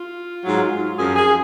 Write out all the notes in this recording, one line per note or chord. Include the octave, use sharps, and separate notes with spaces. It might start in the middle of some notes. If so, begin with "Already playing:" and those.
Already playing: F4
G#2 F#3
F#2 F3 G#4
G#4